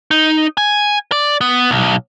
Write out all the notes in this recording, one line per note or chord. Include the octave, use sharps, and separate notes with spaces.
D#4
G#5
D5
B3
B1